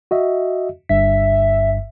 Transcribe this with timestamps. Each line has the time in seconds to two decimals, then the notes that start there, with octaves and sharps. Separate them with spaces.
0.11 F#4 D#5 E5
0.89 G1 G2 E5 B6